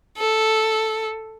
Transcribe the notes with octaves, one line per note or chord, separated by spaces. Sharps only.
A4